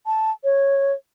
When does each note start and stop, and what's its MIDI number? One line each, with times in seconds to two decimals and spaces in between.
0.06 0.31 81
0.44 0.92 73